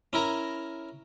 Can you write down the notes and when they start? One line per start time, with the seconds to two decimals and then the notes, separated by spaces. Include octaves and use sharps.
0.13 C#4 E4 A#4 A#5